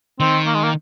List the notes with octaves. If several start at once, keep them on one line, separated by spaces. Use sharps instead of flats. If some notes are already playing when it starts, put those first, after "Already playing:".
D#3 C4
A#3
G#3
A#3